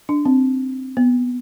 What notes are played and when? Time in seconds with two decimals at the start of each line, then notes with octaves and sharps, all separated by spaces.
0.09 D4
0.25 C4
0.97 B3